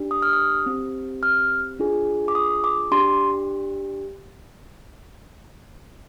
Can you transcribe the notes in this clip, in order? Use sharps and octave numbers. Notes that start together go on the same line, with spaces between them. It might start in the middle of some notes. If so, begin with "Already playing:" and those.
Already playing: D4 G4
D#6
F6
D#6
C4 G4
F6
D4 F4 G#4
D6
D#6
D6
D4 G4 C6